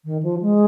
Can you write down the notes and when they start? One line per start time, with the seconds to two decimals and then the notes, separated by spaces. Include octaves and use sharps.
0.05 D#3
0.23 F3
0.41 G#3